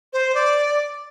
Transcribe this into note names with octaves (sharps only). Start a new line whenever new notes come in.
C5
D5